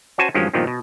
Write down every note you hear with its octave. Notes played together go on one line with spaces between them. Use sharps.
C#4 F#4 C5 G#5 A5
G2 D#3 F3 F#3 G#3 C#4
G2 A#2 D#3 F3 B3 C4
B2